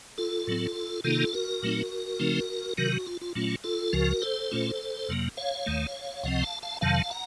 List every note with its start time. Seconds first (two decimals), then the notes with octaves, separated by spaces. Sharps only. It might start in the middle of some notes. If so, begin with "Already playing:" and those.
0.18 F4 A4
0.47 A2 F#3 C4
1.04 C3 D#3 A#3 D#4 F4 A4
1.33 F#4 A#4
1.63 A#2 F#3 A3 C4 D#4
2.20 C#3 F3 A3 C4 D#4
2.78 C3 D#3 F#3 F#4 A#4
2.92 F#4
3.06 F4
3.21 F4
3.35 A#2 F#3 A3 C#4 F4
3.64 F4 A4
3.93 C#2 C#3 F3 F#4 A#4
4.22 A4 C5
4.51 A#2 A3 C#4 F4
5.09 F2 C3 F#3 A#3
5.37 C#5 F5
5.66 D#2 D#3 A3
6.23 C#2 C3 F3 C4 D#5 F#5
6.43 F5 A5
6.63 F5 A5
6.81 F2 C3 D#3 F#3 F5 A5
7.10 F#5 A#5